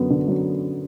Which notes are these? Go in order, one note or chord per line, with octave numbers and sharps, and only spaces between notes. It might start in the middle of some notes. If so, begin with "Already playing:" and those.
Already playing: F#2 D3 F#3 B3
D3
F#3